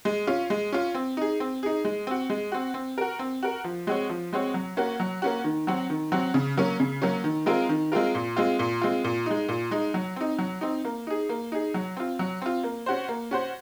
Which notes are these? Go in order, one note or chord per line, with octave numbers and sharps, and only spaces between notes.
G#3
C#4 F4
G#3
C#4 F4
C4
D#4 G#4
C4
D#4 G#4
G#3
C4 F#4
G#3
C4 F#4
C4
F#4 A#4
C4
F#4 A#4
F3
G#3 C4 F#4 C#5
F3
G#3 C4 F#4 C#5
F#3
A#3 C#4 F#4
F#3
A#3 C#4 F#4
D#3
F#3 C4 F#4
D#3
F#3 C4 F#4
C#3
F#3 A#3 C#4
C#3
F#3 A#3 C#4
D#3
G#3 C4 F4 A#4
D#3
G#3 C4 F4 A#4
A#2
G#3 C4 F4
A#2
G#3 C4 F4
A#2
G#3 D#4
A#2
G#3 D#4
F#3
C4 D#4
F#3
C4 D#4
A#3
D#4 G#4
A#3
D#4 G#4
F#3
C4 F4
F#3
C4 F4
A#3
C#4 F#4 C5
A#3
C#4 F#4 C5